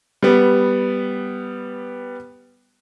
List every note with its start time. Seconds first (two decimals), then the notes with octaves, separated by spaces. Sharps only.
0.22 G3 B3